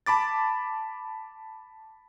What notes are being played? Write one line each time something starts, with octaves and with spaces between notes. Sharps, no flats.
A5 B5 D6 A6